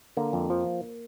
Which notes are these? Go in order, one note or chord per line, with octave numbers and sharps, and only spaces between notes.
D3 A#3
F2
F3